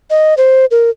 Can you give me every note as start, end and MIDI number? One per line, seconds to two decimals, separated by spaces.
0.10 0.34 75
0.37 0.65 72
0.71 0.90 70